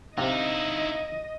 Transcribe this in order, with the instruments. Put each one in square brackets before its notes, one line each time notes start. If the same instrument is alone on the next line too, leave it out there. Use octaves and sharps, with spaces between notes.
[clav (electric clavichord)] C3 [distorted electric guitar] D#4 E4 [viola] D#5 [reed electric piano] F5